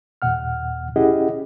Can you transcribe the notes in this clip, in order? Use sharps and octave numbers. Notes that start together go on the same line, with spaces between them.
D#2 A#2 F#5 F6
C#4 E4 G4 G#4 D#5 F#5